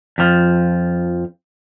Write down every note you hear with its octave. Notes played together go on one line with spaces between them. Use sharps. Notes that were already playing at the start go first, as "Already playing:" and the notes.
F2 F3